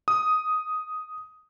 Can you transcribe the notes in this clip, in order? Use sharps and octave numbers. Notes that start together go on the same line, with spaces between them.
D#6